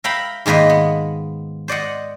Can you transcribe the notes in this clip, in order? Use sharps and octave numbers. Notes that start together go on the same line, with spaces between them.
A#4 E5 F5 G5 A#5 B5
G#2 D#3 A#3 B4 D#5
B3
C5 D5 D#5 F#5